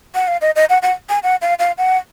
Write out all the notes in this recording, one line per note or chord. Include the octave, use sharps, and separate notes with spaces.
F#5
F5
D#5
D#5
F#5
F#5
G#5
F#5
F5
F5
F#5